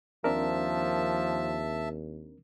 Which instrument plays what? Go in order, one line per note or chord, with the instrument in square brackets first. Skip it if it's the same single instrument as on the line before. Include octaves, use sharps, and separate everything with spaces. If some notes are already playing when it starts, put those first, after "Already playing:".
[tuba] D#2 [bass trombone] F3 [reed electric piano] C4 D4 A#4 [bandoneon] E5 A5